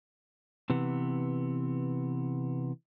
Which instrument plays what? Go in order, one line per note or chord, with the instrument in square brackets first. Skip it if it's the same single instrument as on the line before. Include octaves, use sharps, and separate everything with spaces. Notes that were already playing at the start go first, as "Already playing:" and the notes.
[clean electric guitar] C3 E3 B3